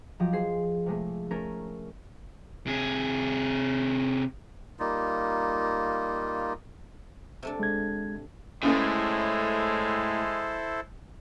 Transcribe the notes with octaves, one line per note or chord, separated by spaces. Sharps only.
F3 F#3 G4 D#5
G#4 C5 C7
C3 G#3 A3
A3 C#4 A4 A#4
C3 G#4
G3 A#3 D#4 F4
C3 A3 D4
G#3 G#6
C#2 A2 C#3 G#3 A3 E4 A4 C5